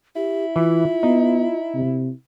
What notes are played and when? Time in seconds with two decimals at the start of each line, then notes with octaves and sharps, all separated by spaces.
0.16 E4 G4
0.56 E3 F4
1.03 B3 D#4
1.74 C3